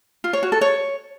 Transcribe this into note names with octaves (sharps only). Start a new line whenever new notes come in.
F4
C#5
F#4
A4
C#5